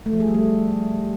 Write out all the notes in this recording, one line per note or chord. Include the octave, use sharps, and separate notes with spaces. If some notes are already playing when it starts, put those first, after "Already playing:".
A3
F3
G#4
G3
A3